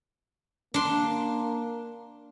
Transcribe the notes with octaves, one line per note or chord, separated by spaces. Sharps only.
A#3 D4 C6